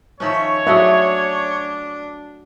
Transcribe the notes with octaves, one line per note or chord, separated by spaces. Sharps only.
D#3 F3 C#4 C#5 E5
F#3 A3 D4 G#4 E5